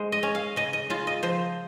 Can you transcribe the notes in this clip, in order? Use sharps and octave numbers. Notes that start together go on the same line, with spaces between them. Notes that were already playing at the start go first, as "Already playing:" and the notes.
Already playing: G#3 C5
D#5
C#4
F5
C#3 D#5
D#5
C#3 F4
D#5
F3 C5